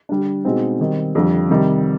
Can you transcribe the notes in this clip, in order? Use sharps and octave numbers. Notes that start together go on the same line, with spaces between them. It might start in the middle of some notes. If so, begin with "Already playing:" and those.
D3 G3 D4
B2 G#3 C4 D#4
D#3 G3 C4
F2 D3 G3
C3 D#3 G3